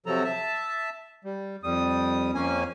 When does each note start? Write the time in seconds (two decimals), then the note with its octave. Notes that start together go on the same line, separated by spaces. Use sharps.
0.06 C3 F3 F#3 A4 A#5
0.24 E5 A5
1.25 G3
1.63 F2 G3 D#6
2.35 F2 A#3 C#4 G#5